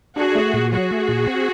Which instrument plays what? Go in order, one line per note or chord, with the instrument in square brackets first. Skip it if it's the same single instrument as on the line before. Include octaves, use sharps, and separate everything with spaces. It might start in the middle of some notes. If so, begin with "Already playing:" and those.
[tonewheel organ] D4 [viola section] F#4 G#4
[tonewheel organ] A3
A#2
[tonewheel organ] F#3 [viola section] F#4 G#4
[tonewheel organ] A3
A#2
C4